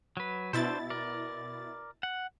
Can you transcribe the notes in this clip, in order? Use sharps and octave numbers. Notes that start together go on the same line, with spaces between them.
F#3 B4
B2 D4 E4 C5 A6
A#4 D5
F#5